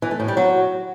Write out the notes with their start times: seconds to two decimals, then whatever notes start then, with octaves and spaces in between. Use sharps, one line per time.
0.02 E3
0.11 A3
0.20 A2
0.28 G3
0.37 F#3